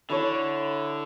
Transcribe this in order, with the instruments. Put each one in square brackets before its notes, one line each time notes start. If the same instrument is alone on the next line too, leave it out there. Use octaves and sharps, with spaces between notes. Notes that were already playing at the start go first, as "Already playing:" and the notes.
[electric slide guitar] D3 [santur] E4 A4 C#5 E5